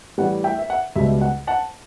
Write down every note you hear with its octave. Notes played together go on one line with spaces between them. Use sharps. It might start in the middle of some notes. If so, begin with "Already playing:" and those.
A2 E3 G3 F#5
E5 G5
E5
F#5
C#2 B2 G3 E5
F#5
F#5 A5